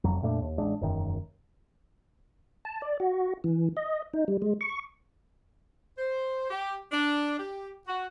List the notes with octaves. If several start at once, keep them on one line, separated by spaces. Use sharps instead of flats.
F1 F2 F#3
F2 A#2 A3 D4
D#2
A1 G#3 D4
E1 F#2 D#3
A5
D5
F#4
E3
D#5
D#4
G3
G#3
C#6
C5
G4
D4
G4
F#4